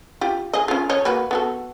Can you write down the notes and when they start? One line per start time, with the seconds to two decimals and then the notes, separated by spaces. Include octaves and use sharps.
0.21 F4 G4
0.53 G#4 D#5
0.68 C#4 F4
0.89 C#5 D#5
1.05 A#3 F#4 B4
1.31 B3 F#4 A4